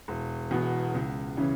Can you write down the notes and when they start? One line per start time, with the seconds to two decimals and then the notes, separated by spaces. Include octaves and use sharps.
0.08 E1
0.51 E2 B2 B3
0.94 C#2
1.37 C#3 E3 C#4